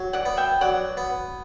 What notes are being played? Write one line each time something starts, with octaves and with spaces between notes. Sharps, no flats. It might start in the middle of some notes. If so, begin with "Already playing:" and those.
Already playing: F#3
D5 F#5
B3
E5 G5
F#3 D5 F#5
B3